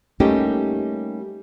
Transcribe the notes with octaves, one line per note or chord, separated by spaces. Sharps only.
G3 A3 A#3 C#4 D#4 G4